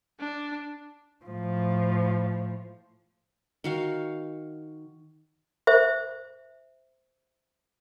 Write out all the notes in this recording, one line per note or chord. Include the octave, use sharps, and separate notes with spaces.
D4
A2 F3
D#3 F#4 F5
C5 E5